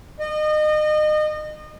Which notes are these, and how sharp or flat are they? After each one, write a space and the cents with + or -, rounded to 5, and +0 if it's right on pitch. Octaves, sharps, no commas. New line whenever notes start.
D#5 -30